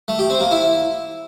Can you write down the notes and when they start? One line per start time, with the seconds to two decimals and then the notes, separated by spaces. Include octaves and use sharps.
0.08 A3
0.19 G4
0.30 C4
0.40 A#3
0.51 E4